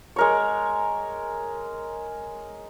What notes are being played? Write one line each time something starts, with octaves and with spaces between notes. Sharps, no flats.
G#3 A#4 C#5